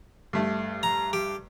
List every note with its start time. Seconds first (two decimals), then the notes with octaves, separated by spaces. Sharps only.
0.33 G2 A3
0.83 A#5
1.13 G4